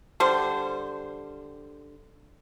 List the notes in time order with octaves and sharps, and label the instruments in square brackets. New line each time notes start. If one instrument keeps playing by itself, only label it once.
[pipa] D3 G3 C5